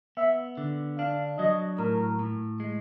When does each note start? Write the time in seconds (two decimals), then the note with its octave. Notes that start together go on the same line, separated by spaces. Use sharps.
0.17 B3 E5
0.57 D3
0.98 D4 F5
1.39 F#3 D#5
1.79 A2 A#4
2.19 A2
2.60 G#3